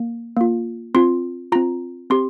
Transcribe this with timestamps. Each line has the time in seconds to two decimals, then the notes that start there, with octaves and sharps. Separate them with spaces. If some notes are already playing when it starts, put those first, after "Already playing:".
Already playing: A#3
0.37 A#3 F4
0.95 C4 F4 C6
1.52 C4 F4 A#5
2.10 C4 G4 C6